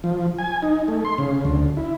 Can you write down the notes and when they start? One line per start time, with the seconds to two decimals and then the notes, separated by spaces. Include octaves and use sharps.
0.04 F3
0.38 G#5
0.63 D#4
0.88 A3
1.05 C6
1.18 C#3
1.45 D2
1.77 E4